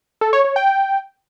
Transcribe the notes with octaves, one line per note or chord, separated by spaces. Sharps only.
A4
C#5
C#5
G5